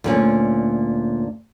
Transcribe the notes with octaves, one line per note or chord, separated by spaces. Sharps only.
D2 A#2 C#4